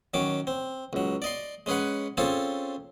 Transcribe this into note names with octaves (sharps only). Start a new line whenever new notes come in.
D#3 F#3 C#4 D6
C4
C#2 F#3
D5 D#5 C6
G#3 C#4 G#4 B4 F#5
C4 C#4 F4 G#4 A4